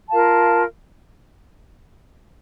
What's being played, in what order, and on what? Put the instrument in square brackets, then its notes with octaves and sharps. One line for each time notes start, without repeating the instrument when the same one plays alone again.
[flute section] F4 A#4 F5 A5